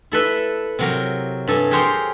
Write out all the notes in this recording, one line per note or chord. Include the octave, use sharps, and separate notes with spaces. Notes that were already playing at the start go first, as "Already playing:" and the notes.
E4 A4 B4 E5
C3 F#3 A#4
G2 A4 G#5
G4 G#4 A#4 C5 C#5 G5